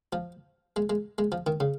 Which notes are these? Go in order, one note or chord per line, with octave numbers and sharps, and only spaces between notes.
F3
G#3
G#3
G#3
F3
D#3
C#3